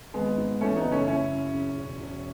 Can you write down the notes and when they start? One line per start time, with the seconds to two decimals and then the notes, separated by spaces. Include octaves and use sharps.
0.14 G#1 G#3 B3
0.38 G#2
0.61 E3 A3 C#4
0.76 B3 D#4
0.84 F#1
0.92 A3 C#4
1.07 F#1 C#4 E4
1.31 F#2
1.53 C#3
1.77 E1
2.00 E1